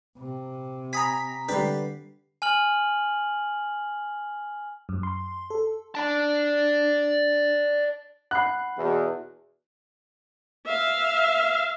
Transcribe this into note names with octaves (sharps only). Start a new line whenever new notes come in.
C3
G#5 A#5 B5 D#6 B6
D3 G3 G4 B4 D5 C7
G#5 F6 F#7
F#2
C6
A4
D4 D5 A5
F#5 B5 F#6 C7
E2 B2 E3
E5 F5